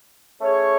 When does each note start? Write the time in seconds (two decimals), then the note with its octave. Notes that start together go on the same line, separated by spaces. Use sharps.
0.39 A3 C#4 G#4 C#5